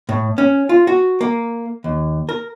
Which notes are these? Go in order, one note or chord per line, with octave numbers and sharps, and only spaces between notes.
A2
C#4
F4
F#4
A#3
D#2
A#4